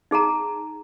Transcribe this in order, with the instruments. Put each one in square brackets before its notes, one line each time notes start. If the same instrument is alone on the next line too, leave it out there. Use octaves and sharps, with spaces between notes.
[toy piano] D#4 G#4 A5 A#5